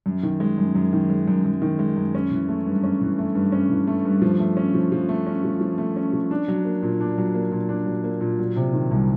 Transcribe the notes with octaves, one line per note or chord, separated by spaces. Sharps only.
F#2
D#3
G#3
F#2
F#2
D#3
G#3
F#2
F#2
D#3
G#3
F#2
C#4
E3
A3
G2
C#4
E3
A3
G2
C#4
E3
A3
G2
F3
A3
C#4
F3
F3
A3
C#4
F3
F3
A3
C#4
F3
D4
F#3
A#3
A#2
D4
F#3
A#3
A#2
D4
F#3
A#3
A#2
F#3
C3
D#3
C2